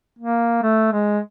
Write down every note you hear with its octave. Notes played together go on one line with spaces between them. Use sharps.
A#3
A3
G#3